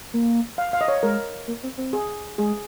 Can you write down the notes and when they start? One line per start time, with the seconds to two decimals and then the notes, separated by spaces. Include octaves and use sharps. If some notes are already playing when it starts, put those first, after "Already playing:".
0.14 A#3
0.58 F5
0.73 F5
0.81 D#5
0.88 C#5
1.03 G#3 A#4
1.48 A#3
1.63 C4
1.78 C4
1.93 G#4
2.38 G#3 G#4